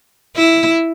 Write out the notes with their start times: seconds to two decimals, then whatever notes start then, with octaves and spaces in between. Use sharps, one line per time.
0.37 E4